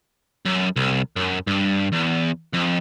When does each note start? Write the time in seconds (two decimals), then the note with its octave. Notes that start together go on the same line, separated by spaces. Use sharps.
0.46 F#2
0.76 C2
1.16 F#2
1.47 G2
1.92 E2
2.53 F2